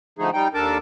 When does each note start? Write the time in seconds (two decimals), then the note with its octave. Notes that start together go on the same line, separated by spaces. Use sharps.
0.19 D3 F3 A3 D#4 G#4
0.33 G3 D#4 G5
0.54 D#2 D4 A4 A#4 A5 D6